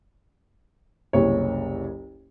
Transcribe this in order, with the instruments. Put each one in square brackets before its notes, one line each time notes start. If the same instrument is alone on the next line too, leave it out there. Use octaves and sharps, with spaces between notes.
[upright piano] F#1 C2 C#5